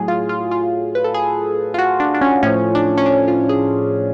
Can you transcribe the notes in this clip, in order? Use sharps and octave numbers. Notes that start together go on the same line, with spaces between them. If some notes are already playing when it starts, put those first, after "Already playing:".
Already playing: A2 F#3 G#4
F4
F4
F4
B4
A4
G#4
F4
F#4
D4
D4
C#4
A2 F3 C#4
D4
C#4
D4
F4
G#4